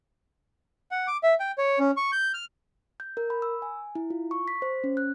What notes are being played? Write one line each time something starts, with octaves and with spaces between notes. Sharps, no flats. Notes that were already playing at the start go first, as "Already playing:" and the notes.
F#5
D6
E5
G5
C#5
C#4
C#6
G6
F6
G6
A#4
B5
E6
G#5
E4
F4
C#6
B6
C5
C#4
F#6